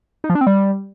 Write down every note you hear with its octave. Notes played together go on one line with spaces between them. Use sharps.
D#4
F3
D4
C4
G3